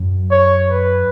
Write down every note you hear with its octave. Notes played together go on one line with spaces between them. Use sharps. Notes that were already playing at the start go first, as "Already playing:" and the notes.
Already playing: F#2
C#5
B4